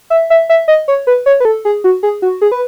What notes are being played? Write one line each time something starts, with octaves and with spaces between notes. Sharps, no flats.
E5
E5
E5
D#5
C#5
B4
C#5
B4
A4
G#4
F#4
G#4
F#4
G#4
B4